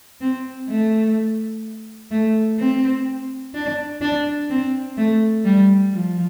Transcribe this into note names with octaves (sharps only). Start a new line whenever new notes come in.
C4
A3
A3
C4
D4
D4
C4
A3
G3
F3